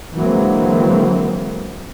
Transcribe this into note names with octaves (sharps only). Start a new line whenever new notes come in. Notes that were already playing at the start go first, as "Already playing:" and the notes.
D3 E3 F#3 G#3 A#3 C4